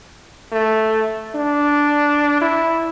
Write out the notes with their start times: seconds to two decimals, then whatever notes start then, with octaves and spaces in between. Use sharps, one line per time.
0.52 A3
1.35 D4
2.41 E4